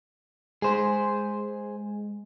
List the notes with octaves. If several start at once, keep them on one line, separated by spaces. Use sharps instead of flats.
G#3 G#4 C5